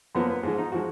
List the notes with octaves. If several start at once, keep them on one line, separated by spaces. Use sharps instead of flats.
F#2 F3 A#3 B3
B3
G#2 F3 G#3
D#4
F3 G#3 F#4